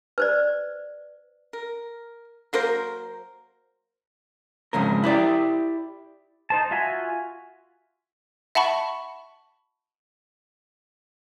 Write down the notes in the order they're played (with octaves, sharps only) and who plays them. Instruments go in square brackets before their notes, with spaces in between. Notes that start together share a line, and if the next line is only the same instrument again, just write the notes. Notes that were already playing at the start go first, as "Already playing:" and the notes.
[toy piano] B4 C5 D5
[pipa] A#4
F#3 A#3 A#4 C5
[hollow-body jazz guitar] F2 G#2 C#3 A#4
E4 G4 D5
[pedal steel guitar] D#4 C5 A5
F4 F#4 E5 G#5
[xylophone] E5 F#5 A5 B5 C#6